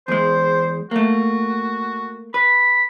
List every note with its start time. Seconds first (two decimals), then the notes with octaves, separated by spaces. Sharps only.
0.08 E2 G#3 C5
0.91 A3 A#3 F#4
2.34 B4 B5